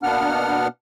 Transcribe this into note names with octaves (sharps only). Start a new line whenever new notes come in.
B2 A#3 B3 D4 F#5 F6